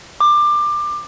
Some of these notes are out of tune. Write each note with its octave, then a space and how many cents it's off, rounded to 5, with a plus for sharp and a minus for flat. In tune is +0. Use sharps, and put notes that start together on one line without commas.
D6 +20